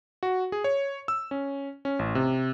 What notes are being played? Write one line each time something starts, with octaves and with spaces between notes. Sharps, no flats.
F#4
G#4
C#5
E6
C#4
C#4
A1
C3